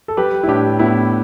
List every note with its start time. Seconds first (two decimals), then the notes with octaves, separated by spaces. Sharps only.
0.08 A4
0.17 G3 G4 B4
0.43 E4
0.48 A2 D4 G4
0.79 A2 B3 E4